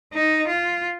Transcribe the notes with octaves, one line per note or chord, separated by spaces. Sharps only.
D#4
F4